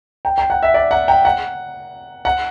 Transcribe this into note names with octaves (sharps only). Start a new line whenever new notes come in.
G5
G5
F#5
E5
D5
F#5
G5
F#5
F#5